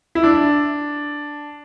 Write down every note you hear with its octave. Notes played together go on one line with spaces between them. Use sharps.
E4
D4